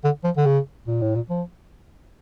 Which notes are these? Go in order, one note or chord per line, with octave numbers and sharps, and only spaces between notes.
D3
F3
D3
C#3
A#2
A2
A#2
F3